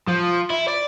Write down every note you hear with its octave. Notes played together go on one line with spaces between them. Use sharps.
F3
E4
D5